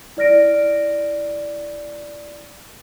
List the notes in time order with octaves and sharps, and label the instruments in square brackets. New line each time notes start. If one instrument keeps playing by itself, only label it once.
[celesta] E4 D5 F6 A#6 D7